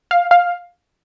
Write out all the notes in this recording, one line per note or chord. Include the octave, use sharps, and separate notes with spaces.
F5
F5